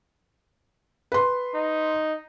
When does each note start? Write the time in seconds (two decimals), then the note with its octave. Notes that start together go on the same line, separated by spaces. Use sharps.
1.12 B4 C6
1.54 D#4